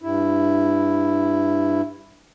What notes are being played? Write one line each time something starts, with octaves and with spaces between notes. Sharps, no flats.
G2 E4